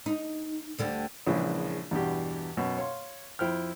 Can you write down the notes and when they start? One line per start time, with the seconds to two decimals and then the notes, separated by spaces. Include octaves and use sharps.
0.06 D#4
0.78 D2 D3 G3
1.27 A#1 C#3 E3 F3 G#3
1.91 E2 G2 B2 G4
2.57 F#2 B2
2.78 C#5 F5 C6
3.39 F2 E4 C5 G5 F6